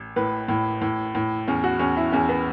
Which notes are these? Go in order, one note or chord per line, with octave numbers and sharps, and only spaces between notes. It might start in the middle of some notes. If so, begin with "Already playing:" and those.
Already playing: A1
A2 B4
A2
A2
A2
E2 C#4
F#4
E2 C#4
E4
E2 C#4
B3